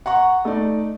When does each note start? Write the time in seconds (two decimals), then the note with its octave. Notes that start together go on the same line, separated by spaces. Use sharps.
0.06 F#5 A#5 C#6
0.45 A3 D#4 D5